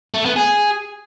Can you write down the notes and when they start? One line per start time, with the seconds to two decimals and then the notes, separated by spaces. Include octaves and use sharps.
0.14 A3
0.25 B3
0.36 G#4